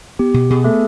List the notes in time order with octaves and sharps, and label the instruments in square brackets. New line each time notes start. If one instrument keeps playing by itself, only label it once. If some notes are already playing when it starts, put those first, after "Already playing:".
[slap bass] B3 [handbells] G4
[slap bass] B2
[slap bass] B2 [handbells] G#4
[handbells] A3 A4 [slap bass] B3